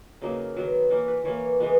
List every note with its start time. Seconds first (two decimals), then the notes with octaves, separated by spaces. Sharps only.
0.22 C#3 F#3 A#3 D#4
0.56 D#3 F#3 B3
0.90 E3 A#3 E4
1.08 B4
1.25 E3 A#3 C#5
1.60 E3 G#3 B3